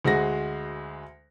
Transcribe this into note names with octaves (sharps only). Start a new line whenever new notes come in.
D2 G#3 F#4 A#6